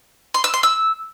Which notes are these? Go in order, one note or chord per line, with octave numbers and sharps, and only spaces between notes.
C6
E6
C6
E6